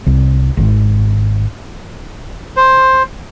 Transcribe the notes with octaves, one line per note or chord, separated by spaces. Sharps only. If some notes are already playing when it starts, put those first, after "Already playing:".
C2
G#1
C5